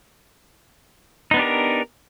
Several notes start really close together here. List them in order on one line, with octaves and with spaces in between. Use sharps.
D#4 B3 D4 G4 A#4